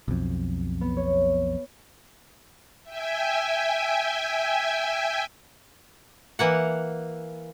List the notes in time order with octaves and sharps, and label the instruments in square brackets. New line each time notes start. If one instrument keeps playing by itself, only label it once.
[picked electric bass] B1 F2
[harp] B3
C#5
[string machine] E5 G5 G#5
[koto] E3 A#3 F#5